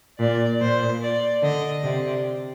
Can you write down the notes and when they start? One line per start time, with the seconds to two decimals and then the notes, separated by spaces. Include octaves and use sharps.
0.19 A#2 D5
0.61 A#2 C5
1.01 D5
1.42 D3 D#5
1.84 C3 D5